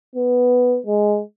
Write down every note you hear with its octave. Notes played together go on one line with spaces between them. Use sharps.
B3
G#3